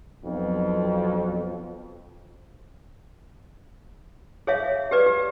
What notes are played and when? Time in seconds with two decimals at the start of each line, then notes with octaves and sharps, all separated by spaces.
0.24 B1 F2
4.47 G#4 C#5 E5 F5
4.91 G4 G#4 B4 D5
5.06 G4